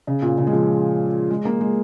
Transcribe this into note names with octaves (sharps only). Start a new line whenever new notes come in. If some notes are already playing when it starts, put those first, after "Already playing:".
C#3
A#2
C#3
G#3
F3
G#3
A#3
G#3